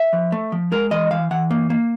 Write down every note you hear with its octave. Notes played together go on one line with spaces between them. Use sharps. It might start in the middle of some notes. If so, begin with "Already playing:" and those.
Already playing: E5
F3
A3
F3
G#3 A#4
E3 D#5
E3 F5
E3 F#5
A#3
A#3